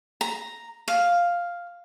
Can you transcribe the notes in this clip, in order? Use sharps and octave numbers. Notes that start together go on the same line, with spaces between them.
A#5
F5